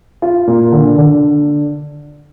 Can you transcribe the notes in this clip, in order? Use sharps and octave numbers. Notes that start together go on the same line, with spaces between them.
F4
A#2
D3
D3